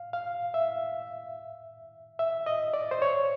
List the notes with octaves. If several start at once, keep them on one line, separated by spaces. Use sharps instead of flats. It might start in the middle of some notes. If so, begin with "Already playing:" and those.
Already playing: F5
F5
E5
E5
D#5
D5
C5
C#5